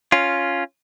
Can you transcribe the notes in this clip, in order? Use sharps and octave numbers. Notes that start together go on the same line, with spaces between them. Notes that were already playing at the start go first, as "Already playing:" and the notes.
C#4 F4